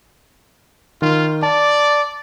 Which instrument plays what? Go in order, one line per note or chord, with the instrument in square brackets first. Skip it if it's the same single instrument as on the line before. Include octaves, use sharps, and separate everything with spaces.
[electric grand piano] D#3 [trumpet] F4
[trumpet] D5 [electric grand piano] A5